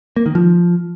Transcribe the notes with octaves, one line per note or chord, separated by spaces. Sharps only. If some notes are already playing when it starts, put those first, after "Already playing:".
A#3
D#3
F3